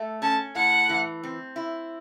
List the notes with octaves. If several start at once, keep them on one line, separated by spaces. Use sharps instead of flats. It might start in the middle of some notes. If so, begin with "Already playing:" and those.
Already playing: A3
C#4 A5
A2 F#5
E3
C4
E4